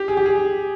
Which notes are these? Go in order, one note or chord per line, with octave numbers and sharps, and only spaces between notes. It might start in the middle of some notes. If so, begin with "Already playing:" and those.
Already playing: G4
G#4
G4
G#4